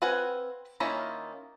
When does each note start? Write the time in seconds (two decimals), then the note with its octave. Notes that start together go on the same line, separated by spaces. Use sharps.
0.02 C4 B4 F5 F#5 G#5
0.80 D#3 A#3 C#4 E4 F4